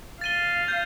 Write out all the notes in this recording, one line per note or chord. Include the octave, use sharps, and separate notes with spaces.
F5 A6 D#7 G7
G6